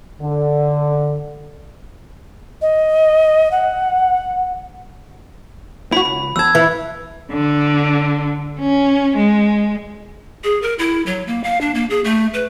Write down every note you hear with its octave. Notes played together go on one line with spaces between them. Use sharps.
D3
D#5
F#5
E4 F#4 B5
C#2
E2 A5 E6 G#6
E3
D3
C#4
G#3
G#4
A#4
E4
F#3
A#3
F5
D4
A#3
G#4
A3
B4